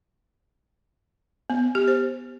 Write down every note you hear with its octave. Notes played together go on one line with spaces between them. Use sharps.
B3
G4
C5